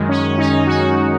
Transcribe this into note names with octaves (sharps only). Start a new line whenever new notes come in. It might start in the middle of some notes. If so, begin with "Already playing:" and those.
Already playing: F#2 D#3 G#3
C#4
D#4
F#4